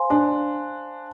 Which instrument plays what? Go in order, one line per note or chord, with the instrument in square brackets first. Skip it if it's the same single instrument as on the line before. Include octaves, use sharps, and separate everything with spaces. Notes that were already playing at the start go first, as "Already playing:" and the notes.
Already playing: [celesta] C5 F5 G#5 C6
[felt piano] D4